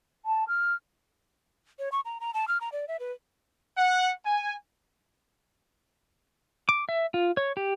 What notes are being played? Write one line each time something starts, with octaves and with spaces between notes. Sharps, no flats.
A5
F6
C#5
C#6
A#5
A#5
A5
F6
A#5
D5
E5
B4
F#5
G#5
D6
E5
F4
C#5
G4